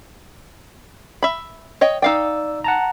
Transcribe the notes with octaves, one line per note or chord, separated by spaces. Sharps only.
E5 B5
C#5 D#5 G5
D#4 D5 F5 G5 E6
F#5 A5 A#5